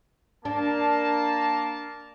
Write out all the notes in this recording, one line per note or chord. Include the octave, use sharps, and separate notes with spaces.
A#3 D4 A5